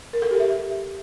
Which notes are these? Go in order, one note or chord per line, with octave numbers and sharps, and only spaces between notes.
A#4
A4
G4
E5